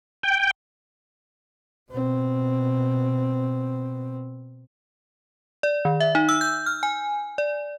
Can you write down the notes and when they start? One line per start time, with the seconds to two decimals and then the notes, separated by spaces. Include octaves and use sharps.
0.23 G5
1.91 B2 C4
5.63 D5
5.85 D#3
6.00 E5
6.15 D#4
6.29 E6
6.41 G6
6.66 F6
6.83 G#5
7.38 D5